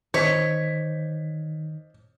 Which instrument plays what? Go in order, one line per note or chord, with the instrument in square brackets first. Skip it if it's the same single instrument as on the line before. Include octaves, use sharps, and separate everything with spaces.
[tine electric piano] D#3 [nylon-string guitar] C5 D#5 F5 [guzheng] C#5 [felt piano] B6